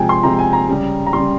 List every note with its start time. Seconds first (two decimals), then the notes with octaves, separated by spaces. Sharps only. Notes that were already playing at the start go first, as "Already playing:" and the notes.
Already playing: C3 F3 G#3 G5 G#5
0.09 C6
0.23 C3 F3 G#3 A#5
0.39 G#5
0.53 A#5
0.69 C#3 G3
1.07 A#5
1.13 C#3 G3 C6